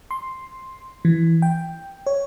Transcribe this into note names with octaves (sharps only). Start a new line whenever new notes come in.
C6
E3
G5
C#5